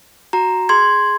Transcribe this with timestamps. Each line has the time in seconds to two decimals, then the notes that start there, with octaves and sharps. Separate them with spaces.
0.33 F#4 A#5
0.69 G#4 C6 G#6